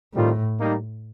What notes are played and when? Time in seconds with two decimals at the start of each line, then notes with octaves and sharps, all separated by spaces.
0.13 A2 D#3 G3 C4 F4 A4
0.58 G3 A#3 D#4